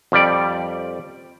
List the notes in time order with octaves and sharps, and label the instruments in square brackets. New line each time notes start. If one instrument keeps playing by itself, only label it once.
[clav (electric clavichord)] F2 G3 D5